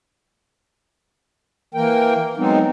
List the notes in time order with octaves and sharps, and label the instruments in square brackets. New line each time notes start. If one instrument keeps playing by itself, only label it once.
[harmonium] E3 A#3 A#4 G5
F#3 G#3 B3 C4 D#4